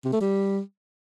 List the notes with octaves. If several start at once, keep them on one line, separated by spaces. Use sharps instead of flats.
C3
A3
G3